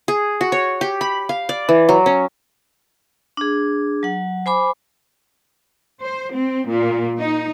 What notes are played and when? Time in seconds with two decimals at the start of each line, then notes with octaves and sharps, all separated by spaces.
0.08 G#4
0.41 F#4
0.52 C#5
0.81 G4
1.01 B5
1.29 F5
1.49 D5
1.69 E3
1.89 F#3
2.06 C#4
3.37 D4 G#4
4.03 F#3 F#5
4.46 C5 G#5 B5 D6
6.02 C5
6.33 C4
6.68 A#2
7.18 D#4